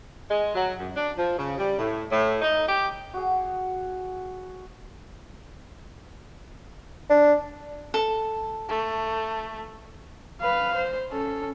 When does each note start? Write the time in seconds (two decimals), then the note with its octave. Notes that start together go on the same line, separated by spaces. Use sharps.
0.31 G#3
0.55 F#3
0.79 F#2
0.96 D4
1.18 F3
1.38 C#3
1.58 G3
1.79 A2
2.12 A2
2.42 D#4
2.69 G4
3.14 F#4 G#4
7.10 D4
7.94 A4
8.69 A3
10.41 B4 F5
10.75 C5
11.09 C#4 A4